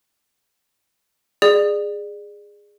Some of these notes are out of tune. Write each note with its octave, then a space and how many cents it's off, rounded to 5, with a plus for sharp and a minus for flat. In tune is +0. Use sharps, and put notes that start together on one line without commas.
G#4 -10 D5 +25